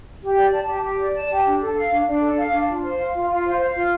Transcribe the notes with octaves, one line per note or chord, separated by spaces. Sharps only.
G4
D5
A5
G4
G4
D5
A5
G4
D4
A4
F5
D4
D4
A4
F5
D4
F4
C5
F5
F4
F4
C5
F5
F4